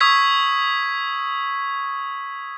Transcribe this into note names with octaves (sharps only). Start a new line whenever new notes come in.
C#6 D#6 E6 G#6 B6